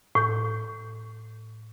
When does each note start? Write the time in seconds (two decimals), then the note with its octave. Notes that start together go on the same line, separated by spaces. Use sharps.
0.15 A2 G6